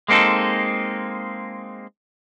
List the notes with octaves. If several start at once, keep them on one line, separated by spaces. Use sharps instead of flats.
G#3 A#3 C4 D#4 A4